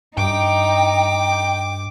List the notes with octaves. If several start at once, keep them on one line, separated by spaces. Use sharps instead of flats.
G2 D#4 G5 D6